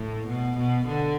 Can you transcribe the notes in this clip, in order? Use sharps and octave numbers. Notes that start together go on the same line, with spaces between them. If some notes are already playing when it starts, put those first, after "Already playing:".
Already playing: A2
B2
B2
D3